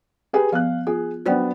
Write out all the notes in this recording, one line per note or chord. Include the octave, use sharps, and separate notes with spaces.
G4 G#4 B4
F3 B3 F5 F#6
F4 G#4
F#3 B3 D4 C5 D5 G5